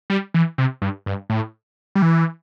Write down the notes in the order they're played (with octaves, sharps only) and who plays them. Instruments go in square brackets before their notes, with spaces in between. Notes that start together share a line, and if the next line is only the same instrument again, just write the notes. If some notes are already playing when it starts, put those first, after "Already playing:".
[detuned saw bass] G3
E3
C3
G2
G2
A2
G3
E3